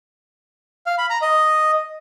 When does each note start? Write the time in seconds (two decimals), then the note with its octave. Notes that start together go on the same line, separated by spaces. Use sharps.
0.86 F5
0.98 B5
1.10 A#5
1.22 D#5